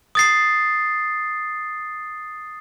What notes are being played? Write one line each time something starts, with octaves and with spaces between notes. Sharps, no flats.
D#6 A6 C7